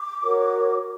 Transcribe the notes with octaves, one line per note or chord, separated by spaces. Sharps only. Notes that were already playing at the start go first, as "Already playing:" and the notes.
Already playing: D6
F#4 A#4 C#5